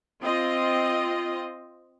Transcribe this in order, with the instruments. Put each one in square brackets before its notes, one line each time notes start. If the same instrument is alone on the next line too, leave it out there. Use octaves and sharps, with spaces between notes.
[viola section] C4 F4 D#5